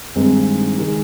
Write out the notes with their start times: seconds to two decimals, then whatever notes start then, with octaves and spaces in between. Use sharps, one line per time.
0.15 G2 D#3 G#3 C4 D#4
0.78 D#3 G#3